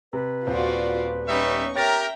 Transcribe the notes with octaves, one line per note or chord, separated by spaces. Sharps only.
C3 B4
D#1 C4 F4 F#4 D5
G3 B3 C#4 D#4 E5 C#6
G4 A#4 C#5 E5 G5 A#5 A6